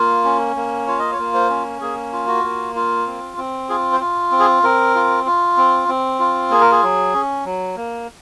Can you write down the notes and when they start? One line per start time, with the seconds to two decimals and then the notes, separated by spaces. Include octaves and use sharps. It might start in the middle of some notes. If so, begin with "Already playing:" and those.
Already playing: A#3 F4
0.25 C#4
0.56 A#3
0.87 F4 C#5
0.99 D#5
1.12 C#5
1.18 A#3
1.34 C5
1.50 C#4
1.81 A#3 G#4
2.12 F4
2.28 F#4
2.44 A#3
2.76 F4
3.06 C4
3.37 C4
3.69 F4 G#4
3.93 C5
4.00 F4
4.31 C4
4.39 G#4
4.63 C4 A#4
4.95 F4
5.26 F4
5.57 C4
5.88 C4
6.19 F4
6.50 A#3 G#4
6.61 A#4
6.72 G#4
6.83 F#3
7.14 C#4
7.45 F#3
7.76 A#3